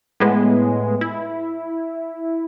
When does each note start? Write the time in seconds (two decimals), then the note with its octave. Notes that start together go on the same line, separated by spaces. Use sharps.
0.20 A2 G#3 B3
1.01 E4